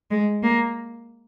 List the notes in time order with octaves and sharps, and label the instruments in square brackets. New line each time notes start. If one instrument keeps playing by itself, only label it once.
[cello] G#3
A#3